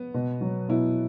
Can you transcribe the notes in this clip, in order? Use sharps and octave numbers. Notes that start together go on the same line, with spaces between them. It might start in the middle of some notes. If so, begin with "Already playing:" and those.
Already playing: B3
B2
F#3
B2 E4